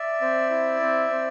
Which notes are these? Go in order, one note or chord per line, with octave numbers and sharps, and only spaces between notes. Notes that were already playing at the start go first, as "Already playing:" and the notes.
Already playing: D5 E5
C4
E4
C4
C4